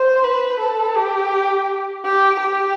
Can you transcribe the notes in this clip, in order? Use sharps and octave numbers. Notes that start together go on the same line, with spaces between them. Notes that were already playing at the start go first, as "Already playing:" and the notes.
Already playing: C5
B4
A4
G4
G4
G4